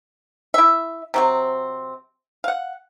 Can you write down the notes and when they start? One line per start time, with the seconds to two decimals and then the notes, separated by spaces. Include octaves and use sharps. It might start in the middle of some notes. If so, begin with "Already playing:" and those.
0.54 E4 E5
1.14 C3 F#3 C4
2.44 F5 F#5